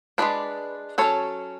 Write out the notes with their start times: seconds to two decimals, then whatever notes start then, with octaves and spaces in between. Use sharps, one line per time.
0.18 G#3 B3 D4 B4 D5
0.98 F#3 C#4 A4 C#5